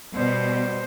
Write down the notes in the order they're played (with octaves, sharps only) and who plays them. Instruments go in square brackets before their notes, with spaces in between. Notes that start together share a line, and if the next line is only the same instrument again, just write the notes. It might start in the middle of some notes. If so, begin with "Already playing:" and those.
[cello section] B2 [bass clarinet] G3 [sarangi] C5